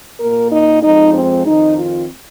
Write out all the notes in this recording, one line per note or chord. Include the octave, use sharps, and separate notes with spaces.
A#2 A#3 A#4
D#4
F2 F3 G#3 D#4
C4
F2 D#3 C4 D#4
F4